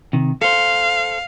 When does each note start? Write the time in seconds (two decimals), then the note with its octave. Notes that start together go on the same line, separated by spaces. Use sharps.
0.13 C3 D#3
0.42 A4 C5 F5